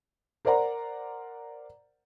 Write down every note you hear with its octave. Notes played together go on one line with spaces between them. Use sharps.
A#4 C5 D5 F#5 A#5